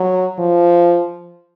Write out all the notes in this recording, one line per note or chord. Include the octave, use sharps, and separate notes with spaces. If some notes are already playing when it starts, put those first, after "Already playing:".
Already playing: F#3
F3